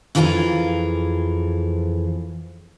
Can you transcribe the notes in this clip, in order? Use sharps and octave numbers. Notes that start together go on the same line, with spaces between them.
F2 E3 F4 G#4 A5 A#5